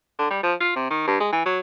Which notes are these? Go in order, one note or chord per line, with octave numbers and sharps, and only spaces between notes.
D3
G3
F3
F4
C3
D#3
G2
G#3
E3
F#3